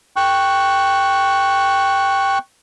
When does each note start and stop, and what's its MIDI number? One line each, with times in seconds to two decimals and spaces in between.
0.16 2.38 79
0.16 2.38 85
0.16 2.38 90